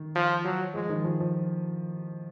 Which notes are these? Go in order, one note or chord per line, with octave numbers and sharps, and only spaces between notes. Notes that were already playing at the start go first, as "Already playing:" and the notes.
Already playing: D#3
F3
F#3
F3 G#3
D#3
F3
F3